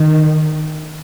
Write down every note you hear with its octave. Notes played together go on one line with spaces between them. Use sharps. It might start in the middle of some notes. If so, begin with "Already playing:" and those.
Already playing: D#3